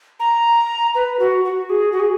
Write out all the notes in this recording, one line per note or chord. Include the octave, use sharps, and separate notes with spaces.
A#5
B4
F#4
F#4
G#4
F#4
G#4